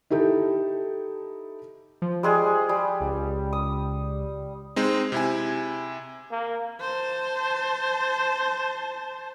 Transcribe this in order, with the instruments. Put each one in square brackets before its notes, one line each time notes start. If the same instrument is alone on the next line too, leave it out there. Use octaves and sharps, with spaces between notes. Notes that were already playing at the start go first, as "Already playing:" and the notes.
[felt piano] D#4 E4 G4 A4
[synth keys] F3
[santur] G3 G#3 G#4
G3
[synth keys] C#2
[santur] D#6
[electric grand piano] G#3 C4 D#4
C3 E4 G#5
[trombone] A#3
[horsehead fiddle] C5 A5